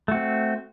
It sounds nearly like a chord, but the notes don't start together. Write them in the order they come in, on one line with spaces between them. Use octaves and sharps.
A3 F#4 C4